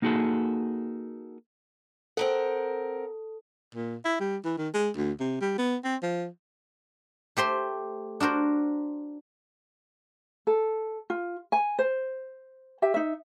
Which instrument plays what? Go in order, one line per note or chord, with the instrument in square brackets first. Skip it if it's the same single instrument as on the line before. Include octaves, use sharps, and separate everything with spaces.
[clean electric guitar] A#3 D#4 F#4 G#4 A4
[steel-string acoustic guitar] C4 A#4 F#5 [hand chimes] A4
[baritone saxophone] A#2
E4
G3
E3
D#3
G#3
D2
C3
G3
B3
C4
F3
[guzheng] A3 G4 C5 C6
D4 F#4 A#4 C5
[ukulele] A4
F4
G#5
C5
G4 E5
D#4 E5